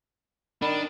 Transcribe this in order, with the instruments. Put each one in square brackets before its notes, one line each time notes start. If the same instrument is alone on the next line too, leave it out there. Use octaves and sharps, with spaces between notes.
[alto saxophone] D#3 [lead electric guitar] D4 [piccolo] B5